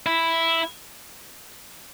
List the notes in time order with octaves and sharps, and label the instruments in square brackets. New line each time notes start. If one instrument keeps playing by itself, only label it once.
[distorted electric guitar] E4